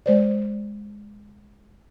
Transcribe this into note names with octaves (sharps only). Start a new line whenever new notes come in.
G#3 C5 D5